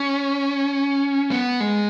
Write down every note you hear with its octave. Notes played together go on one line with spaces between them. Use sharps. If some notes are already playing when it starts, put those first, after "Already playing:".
Already playing: C#4
B3
G#3